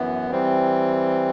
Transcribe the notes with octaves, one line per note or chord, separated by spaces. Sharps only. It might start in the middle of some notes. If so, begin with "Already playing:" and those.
Already playing: F#2 E3 B3
E3 G3 C4